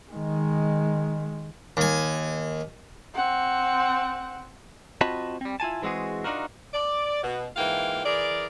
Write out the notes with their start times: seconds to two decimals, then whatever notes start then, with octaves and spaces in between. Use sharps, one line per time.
0.11 D#3 G#3
1.77 D#2 G#5
3.15 C4 F#5
5.01 C4 F4 F#4 D#5 A5 B5
5.41 G3 C4
5.60 E4 F4 G#5 A5
5.82 E3 G#3 C4 F#4 G#4
6.24 D4 D#4 F4 F#4 A#4
6.73 D5
7.23 B2
7.57 G#2 E3 A#3 F4 F5 G5
8.04 E3 G#4 A#4 D5